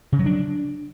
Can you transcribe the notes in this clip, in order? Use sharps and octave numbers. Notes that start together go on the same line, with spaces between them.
C#3
F#3
D4